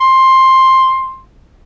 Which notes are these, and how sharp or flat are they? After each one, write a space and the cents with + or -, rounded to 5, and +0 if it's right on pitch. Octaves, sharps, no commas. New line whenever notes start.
C6 +10